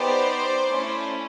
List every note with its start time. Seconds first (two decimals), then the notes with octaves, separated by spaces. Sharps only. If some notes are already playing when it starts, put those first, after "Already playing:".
Already playing: B3 D#4 G4 C5 D5
0.70 A3 C#4 E4